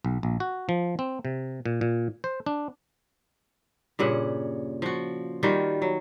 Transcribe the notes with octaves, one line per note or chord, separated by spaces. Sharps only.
B1
A#1
F#4
F3
C4
C3
A#2
A#2
C5
D4
G2 A#2 C#3 F#5
F3 F#4
D#3 G3 F4 F#4
F#3